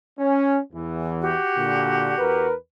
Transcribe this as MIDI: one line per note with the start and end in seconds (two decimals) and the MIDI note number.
0.19 0.59 61
0.73 1.35 40
0.73 1.35 52
1.20 2.46 66
1.20 2.46 67
1.56 2.13 46
1.56 2.13 50
2.19 2.53 40
2.19 2.53 70
2.19 2.53 71